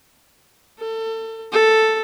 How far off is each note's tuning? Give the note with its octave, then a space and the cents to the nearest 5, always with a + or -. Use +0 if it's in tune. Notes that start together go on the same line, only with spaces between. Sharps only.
A4 +30
A4 +0